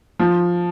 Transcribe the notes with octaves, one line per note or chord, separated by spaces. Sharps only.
F3